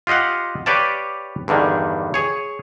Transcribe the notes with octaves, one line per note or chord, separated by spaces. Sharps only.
F4 G4 D#5 F5 F#5
G4 B4 C#5 D5 F5 A5
E2 G2 D3 D#3
G#4 C#5